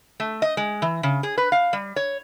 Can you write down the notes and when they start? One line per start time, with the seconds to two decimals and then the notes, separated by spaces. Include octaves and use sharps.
0.20 A3
0.42 D#5
0.57 G#3
0.82 E3
1.03 C#3
1.23 G#4
1.38 B4
1.52 F5
1.73 G3
1.96 C#5